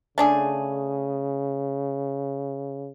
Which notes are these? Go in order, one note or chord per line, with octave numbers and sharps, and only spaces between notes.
C#3 A3 D4 G#4